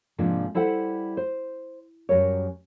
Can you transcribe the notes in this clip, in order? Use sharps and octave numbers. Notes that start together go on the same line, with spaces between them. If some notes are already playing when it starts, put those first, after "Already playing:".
G#2 C3 F3 A#3 D4
G3 E4 A4 C5 F#5
C5
F#2 G3 A#4 C#5